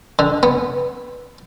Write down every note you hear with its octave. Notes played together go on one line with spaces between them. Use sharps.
D3
B3